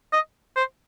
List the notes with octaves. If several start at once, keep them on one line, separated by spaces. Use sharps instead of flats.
D#5
C5